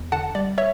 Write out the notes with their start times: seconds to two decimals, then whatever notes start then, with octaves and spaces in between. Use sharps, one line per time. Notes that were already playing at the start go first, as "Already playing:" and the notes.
Already playing: E2
0.12 D3 F#5 A5
0.35 G3 D5
0.58 C#5 E5